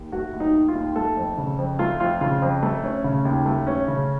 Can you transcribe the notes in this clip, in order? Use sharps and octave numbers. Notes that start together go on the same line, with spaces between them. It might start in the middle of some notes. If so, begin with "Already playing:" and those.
Already playing: D#2
A3 F#4
D#2
D#4
D#3
F4
D#2
A3 A4
F2
C#3
F2
A3 F4
F2 F4
C#3 F4
F2
A3
C#4
C#3
D#2
A3
C#4
C#3